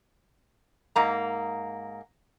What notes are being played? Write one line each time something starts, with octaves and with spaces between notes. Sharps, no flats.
G#2 A#3 A#5